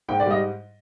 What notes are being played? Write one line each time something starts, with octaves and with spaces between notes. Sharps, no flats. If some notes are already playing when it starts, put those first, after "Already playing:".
G#2 G5
D5
G3
D#5